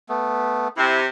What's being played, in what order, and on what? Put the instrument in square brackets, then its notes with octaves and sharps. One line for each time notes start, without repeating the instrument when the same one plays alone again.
[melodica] A3 B3
[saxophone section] C3 [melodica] E4